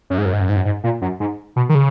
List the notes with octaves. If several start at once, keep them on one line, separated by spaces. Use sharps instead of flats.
F#2
G#2
F#2
G#2
F#2
G#2
F#2
G#2
A#2
F#2
G#2
B2
D#3
C#3